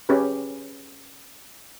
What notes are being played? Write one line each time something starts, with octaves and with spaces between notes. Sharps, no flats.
C#4 G4 G#4 B4